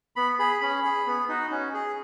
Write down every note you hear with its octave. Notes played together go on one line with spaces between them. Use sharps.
B3 B5
G#4 B5
C#4 B5
G#4
B3
D#4 F#4
C#4
G#4